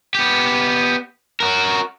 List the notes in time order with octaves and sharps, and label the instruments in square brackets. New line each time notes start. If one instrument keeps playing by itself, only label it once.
[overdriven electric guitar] B3 G4
F#4 A#4